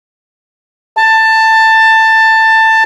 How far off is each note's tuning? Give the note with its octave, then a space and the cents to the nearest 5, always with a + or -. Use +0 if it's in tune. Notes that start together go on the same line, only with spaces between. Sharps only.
A5 +15